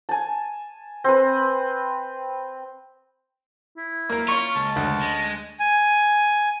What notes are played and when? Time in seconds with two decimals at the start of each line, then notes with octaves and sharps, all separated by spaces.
0.09 G#5 A5
1.04 C4 B4
3.77 E4
4.09 A#3 A#4
4.28 C#4 F4 C#6
4.56 C#2 A5
4.76 D2
5.01 G#3
5.60 G#5